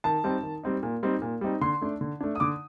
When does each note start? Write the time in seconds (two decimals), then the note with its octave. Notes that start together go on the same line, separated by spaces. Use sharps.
0.04 D#3 A5
0.24 G3 C4 D#4
0.43 D#3
0.63 G3 C4 D#4
0.83 A#2
1.03 G3 C4 D#4
1.22 A#2
1.41 G3 C4 D#4
1.61 D3 C6
1.81 A3 D4
2.01 D3
2.21 A3 D4
2.35 D#6
2.40 D3 D6